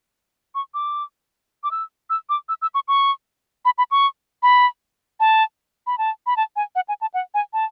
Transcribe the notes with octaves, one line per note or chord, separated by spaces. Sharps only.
C#6
D6
D6
E6
E6
D6
E6
E6
C#6
C#6
B5
B5
C#6
B5
A5
B5
A5
B5
A5
G#5
F#5
G#5
A5
F#5
G#5
A5